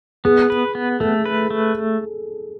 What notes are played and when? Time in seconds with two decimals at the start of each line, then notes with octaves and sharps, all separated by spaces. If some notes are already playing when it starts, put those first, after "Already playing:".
0.25 B3 G#4
0.50 B4
0.75 B3
1.00 A3 A4
1.26 B4
1.50 A3